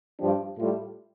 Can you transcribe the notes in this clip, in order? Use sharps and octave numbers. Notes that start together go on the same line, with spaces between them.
G2 F3 D4 G4
A2 G3 F4 A4